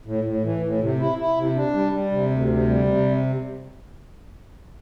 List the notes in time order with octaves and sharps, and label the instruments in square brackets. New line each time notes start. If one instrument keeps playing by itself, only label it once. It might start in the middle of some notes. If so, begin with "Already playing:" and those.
[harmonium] A2
A2
E3
A2
C3
E4
E4
C3
D4
G3
G3
C3
D2
C3
G3
C3